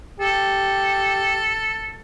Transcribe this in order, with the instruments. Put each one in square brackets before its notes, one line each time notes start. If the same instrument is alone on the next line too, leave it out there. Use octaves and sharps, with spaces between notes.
[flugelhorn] G4 [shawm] A4